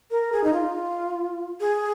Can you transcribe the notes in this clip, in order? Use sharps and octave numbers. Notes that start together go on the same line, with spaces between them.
A#4
G#4
D#4
F4
G#4